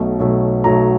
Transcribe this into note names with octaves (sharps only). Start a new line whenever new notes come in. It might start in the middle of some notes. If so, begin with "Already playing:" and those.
Already playing: B1 B2 F#3 A3
B1 B2 F#3 A3
B1 B2 F#3 A3 A#5